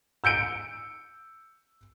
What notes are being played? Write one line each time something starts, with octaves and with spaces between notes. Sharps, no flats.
E6 G6 C#7 D7